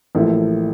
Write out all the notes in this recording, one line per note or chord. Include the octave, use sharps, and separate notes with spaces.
A1 A2 F3 A#3 E4